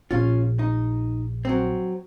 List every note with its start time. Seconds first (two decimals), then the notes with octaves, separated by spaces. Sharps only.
0.11 A#1 C#4 F4
0.59 D#4
1.45 F#3 C4